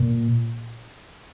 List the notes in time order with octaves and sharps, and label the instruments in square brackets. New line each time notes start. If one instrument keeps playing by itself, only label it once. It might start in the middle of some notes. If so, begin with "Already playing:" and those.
Already playing: [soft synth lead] A#2